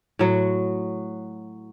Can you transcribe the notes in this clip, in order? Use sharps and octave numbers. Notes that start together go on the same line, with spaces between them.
A2 F#3 F#4